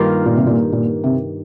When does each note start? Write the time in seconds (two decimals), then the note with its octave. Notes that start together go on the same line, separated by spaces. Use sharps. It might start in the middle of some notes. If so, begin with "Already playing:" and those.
Already playing: G2 D#3 A#3 F4
0.25 A#2
0.36 C3
0.47 A#2
0.72 A#2
1.04 C3